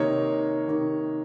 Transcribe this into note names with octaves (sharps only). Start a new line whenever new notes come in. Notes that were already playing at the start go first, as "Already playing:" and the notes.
Already playing: C3 D#3 A#3 D#4 C#5
C3 D#3 A#3 D#4